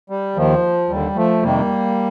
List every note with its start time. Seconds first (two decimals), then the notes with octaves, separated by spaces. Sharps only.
0.10 G3
0.36 D#2 D#3 F3
0.89 D#2 D3 G3
1.16 F3 A3
1.42 F2 C3 D#3 G3 A#3